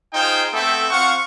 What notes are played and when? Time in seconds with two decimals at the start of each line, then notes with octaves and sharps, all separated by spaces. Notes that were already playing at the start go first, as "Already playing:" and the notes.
0.13 D#4 F4 G#4 C5 G5
0.53 A3 B3 C4 A4 E5 G5
0.91 C4 F4 F5 F#5 C#6